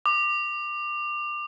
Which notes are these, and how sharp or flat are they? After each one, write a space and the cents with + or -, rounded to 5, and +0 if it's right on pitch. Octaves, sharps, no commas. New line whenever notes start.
D6 +25